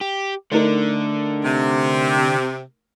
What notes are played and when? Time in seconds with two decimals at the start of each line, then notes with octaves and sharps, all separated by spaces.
0.01 G4
0.52 D3 A3 D4 D#4 A#4
1.44 C3